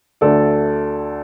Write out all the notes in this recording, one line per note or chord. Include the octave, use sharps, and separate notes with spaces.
D2 D3 A3 A4 D5